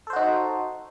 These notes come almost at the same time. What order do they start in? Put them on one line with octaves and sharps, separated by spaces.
A4 C5 F#4 D#4